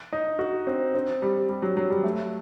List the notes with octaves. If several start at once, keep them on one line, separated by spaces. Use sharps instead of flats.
D#4
F#4
C4
C4
G3
G3
F#3
F#3
G3
A3